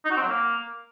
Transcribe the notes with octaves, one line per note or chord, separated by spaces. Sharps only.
D#4
F#4
C4
F#3
A#3